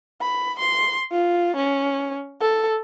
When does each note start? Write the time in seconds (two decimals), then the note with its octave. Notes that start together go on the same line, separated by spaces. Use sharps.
0.21 B5
0.59 C6
1.12 F4
1.56 C#4
2.41 A4